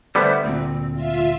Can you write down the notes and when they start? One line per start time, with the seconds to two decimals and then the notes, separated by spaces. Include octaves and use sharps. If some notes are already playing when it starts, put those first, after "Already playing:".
0.15 D3 G3 A3 B3 C5 E5
0.45 D2 A#2 C4
0.93 F4 E5